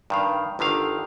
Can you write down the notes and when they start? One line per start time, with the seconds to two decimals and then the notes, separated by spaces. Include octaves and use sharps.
0.10 G2 D#3 F5
0.59 G1 D3 D#3 F5